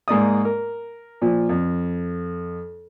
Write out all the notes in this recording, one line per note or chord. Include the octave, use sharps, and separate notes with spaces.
G#2 A#3 D5 D#6
A#4
A#2 F3
F2